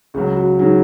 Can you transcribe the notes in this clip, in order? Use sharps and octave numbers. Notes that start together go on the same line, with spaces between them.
C#2 C#3 F#3 G#4
F#4
C#3 F#3 D#4